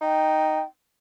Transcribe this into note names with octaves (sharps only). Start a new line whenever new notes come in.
D#4 G5